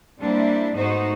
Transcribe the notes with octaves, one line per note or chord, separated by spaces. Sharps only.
G3 A#3 C4 D4 E4
G#2 A3 B3 D#4 F#4 C5